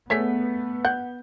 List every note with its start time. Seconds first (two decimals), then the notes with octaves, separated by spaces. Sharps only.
0.10 A3 B3 G#4 C#5 B6
0.85 F#5 G6